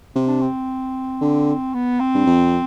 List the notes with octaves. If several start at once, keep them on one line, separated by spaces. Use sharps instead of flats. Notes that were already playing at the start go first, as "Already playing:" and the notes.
C3 C4
D4
C4
D3
B3
C4
G2
F2